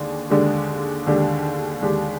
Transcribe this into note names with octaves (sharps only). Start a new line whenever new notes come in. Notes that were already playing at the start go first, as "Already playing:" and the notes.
Already playing: D#2 D3 G#3 D4
D#2 D3 G#3 D4 G4
D#2 D3 G#3 D4 G4
D#2 D3 G#3 D4 G4